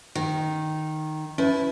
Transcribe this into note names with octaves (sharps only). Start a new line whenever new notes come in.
D#3
C#4 E4 B4